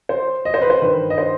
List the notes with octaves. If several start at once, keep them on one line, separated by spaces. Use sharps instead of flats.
C5
D#5
C5
B4
C5
G2 D#3 B4
D#5
C5